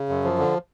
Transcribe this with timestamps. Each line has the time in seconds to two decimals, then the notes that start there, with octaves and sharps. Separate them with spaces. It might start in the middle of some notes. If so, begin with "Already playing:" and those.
Already playing: C#3
0.09 F#2
0.24 F3
0.38 D3